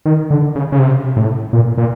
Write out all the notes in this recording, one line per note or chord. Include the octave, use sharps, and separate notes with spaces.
D#3
D3
C#3
C#3
C3
A2
A#2
A#2